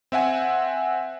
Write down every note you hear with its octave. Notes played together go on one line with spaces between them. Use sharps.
C4 E5 F#5 G#5